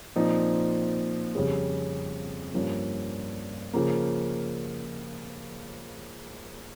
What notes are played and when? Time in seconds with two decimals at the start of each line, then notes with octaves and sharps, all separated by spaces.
0.16 A#2 F3 C4 D#4
1.35 F2 C#3 G3 C#4 G#4
2.54 G2 F3 A#3 C#4
3.73 C#3 F3 A#3